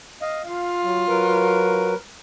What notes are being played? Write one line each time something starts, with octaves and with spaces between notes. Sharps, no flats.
D#5 F5
F4 F5
F#3
F#3 A#4 B4